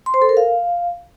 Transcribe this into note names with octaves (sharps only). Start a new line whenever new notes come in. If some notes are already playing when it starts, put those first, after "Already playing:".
C6
C5
A4
A#4
F5